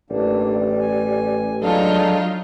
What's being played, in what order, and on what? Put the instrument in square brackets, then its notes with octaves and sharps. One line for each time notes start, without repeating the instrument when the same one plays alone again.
[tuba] A1 [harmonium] E3 A#3 D4 [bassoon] G3
[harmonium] G#5
[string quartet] F#3 D#4 F4 [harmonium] G#3 D4 A4